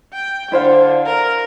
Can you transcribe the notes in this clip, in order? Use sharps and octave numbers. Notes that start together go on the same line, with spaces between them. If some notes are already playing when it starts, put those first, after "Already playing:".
G5
D3 E4 C5 F5
A#4